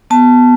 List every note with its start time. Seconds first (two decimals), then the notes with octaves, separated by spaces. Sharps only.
0.10 B3 A5